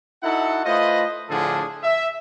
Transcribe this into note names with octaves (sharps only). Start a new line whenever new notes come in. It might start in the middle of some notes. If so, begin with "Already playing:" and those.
D#4 E4 F#4 A4 F#5
A3 F4 B4 C5 D#5
A2 D3 F3 D4 G#4 A4
E5